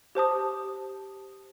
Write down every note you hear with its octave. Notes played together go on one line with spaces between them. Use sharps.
G4 C5 A5 D#6